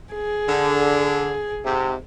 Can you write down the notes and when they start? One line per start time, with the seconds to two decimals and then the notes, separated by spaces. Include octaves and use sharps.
0.14 G#4
0.48 D3
1.64 G#2 C3